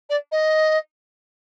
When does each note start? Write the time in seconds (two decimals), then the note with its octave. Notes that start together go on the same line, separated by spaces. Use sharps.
0.09 D5
0.31 D#5